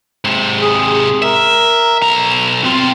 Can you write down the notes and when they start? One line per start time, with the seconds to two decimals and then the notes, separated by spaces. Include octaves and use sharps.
0.25 G#2 C3
0.61 G#4
1.22 A#4 E5
2.02 B1 A#5
2.64 B2 C4 F4